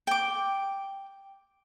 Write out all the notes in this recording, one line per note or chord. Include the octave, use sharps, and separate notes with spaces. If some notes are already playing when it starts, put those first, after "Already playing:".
G5 D6